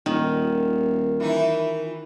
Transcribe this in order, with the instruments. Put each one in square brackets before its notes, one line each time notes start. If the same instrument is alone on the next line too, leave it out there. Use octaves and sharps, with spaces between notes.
[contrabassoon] D#1 [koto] D#3 [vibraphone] F4 A#4
[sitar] E3 D#4 E4